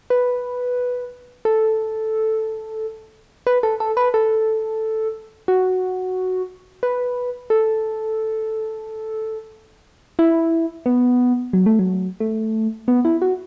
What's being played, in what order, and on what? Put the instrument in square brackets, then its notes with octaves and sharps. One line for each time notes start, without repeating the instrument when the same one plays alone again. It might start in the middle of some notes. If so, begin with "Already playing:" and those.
[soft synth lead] B4
A4
B4
A4
A4
B4
A4
F#4
B4
A4
E4
B3
F#3
A3
F#3
A3
B3
E4
F#4